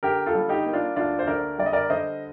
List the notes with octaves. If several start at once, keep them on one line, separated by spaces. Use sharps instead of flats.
D3 G4 A#4
F4 A4
G3
D#4 G4
A#3
D4 F4
D2 D4 F4
C5
D3 A#4 D5
G3 D5
D#5
A#4 D5
D3 C5 D#5